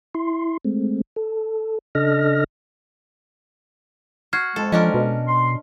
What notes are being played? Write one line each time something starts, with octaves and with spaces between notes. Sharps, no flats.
E4 C6
G#3 A3 C4
A4
C#3 D4 A4 D#5 F6 A#6
F#4 F6 G#6 C7
F2 G#3 A4
F3 C#4 D4 A#4 D#5
B2
C6